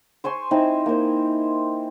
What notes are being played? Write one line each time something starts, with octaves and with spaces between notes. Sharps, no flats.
C5 G#5 C6 C#6
C4 D#4 E4
A#3 C5